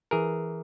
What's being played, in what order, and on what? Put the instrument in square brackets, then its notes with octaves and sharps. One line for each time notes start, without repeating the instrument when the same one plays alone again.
[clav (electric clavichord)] E3 G#4 A#4